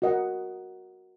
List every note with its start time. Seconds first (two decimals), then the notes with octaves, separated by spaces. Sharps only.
0.02 F#4 A#4 D#5 F#5